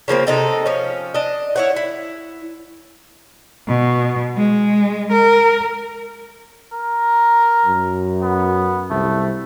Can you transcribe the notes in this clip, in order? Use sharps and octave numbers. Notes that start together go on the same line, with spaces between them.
C#3 F3 A#3 C4
C3 D#4 A4
F3 C#4
D4 D#5
E4 C#5 F#5
E4
B2
G#3
A#4
A#4
F#2
B3
C2 A3